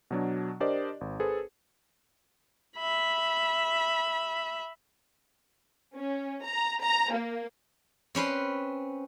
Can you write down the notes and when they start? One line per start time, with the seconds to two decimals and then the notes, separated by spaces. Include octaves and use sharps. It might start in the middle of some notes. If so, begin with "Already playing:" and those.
0.11 B2 F#3 D4
0.60 D4 G4 A#4 C5 D5 D#5
1.01 G#1
1.20 G#4 A4 B4 C5
2.77 E5 B5
5.94 C#4
6.44 A#5
6.82 A#5
7.13 A#3
8.15 C4 C#4 B4 C5